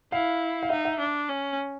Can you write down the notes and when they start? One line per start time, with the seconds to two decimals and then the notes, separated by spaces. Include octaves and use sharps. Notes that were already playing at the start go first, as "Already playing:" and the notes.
0.12 E4 F5
0.63 F5
0.70 D#4 E5
0.85 E5
1.00 D4
1.29 C#4